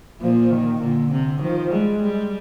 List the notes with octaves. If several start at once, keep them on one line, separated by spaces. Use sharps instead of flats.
A#2 F3
D#3
A#2 D3
C3
D#3 F3
G3 G#3
G3